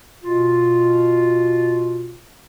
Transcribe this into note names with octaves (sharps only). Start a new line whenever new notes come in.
B2 F4